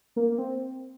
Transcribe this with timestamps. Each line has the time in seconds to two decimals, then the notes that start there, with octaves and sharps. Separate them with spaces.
0.16 A#3
0.32 A#3
0.38 C4